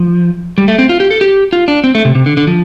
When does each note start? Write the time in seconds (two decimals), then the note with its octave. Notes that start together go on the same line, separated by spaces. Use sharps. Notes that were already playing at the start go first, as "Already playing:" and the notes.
Already playing: F3
0.58 G3
0.68 A3
0.79 C4
0.89 F4
1.00 G4
1.11 A4
1.21 G4
1.53 F4
1.68 D4
1.84 C4
1.95 A3
2.05 C3
2.15 C3
2.26 D3
2.37 D3
2.47 F3